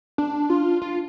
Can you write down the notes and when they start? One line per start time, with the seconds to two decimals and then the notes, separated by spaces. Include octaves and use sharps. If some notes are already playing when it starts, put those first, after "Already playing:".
0.18 D4
0.50 F4
0.82 F4